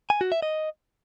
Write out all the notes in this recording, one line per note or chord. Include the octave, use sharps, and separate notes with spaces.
G#5
F#4
E5
D#5